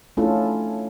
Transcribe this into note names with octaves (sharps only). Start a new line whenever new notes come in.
A3 C#4 D4 E4 F4 A4